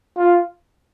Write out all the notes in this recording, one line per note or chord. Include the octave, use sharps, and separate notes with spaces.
F4